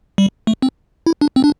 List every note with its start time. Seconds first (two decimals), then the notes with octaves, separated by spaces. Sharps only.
0.18 G3
0.47 A3
0.62 C4
1.06 E4
1.21 D4
1.36 C4
1.44 D4